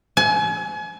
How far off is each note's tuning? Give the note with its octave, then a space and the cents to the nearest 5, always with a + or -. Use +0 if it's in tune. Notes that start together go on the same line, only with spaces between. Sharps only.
G#5 +35